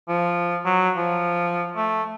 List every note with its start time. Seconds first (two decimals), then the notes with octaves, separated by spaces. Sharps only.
0.08 F3
0.65 F#3
0.97 F3
1.76 A3